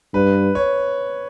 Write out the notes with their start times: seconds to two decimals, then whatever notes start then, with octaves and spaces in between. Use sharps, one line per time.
0.14 G2 B4
0.55 C#5